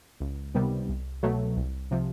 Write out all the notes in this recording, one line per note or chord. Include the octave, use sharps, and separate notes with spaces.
C#2
C3 D#3 G3 B3
C2
B2 F#3 A3
C2
C3 F3